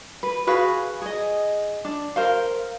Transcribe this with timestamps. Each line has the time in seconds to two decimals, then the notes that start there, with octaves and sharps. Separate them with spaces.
0.23 B4
0.47 F#4 G#4 B4 F5
1.02 G#4 D#5
1.85 D4
2.16 A#4 C5 F5